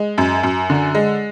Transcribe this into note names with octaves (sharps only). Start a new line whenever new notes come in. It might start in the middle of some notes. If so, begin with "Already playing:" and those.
Already playing: G#3
F#2
F#2
D3
G#3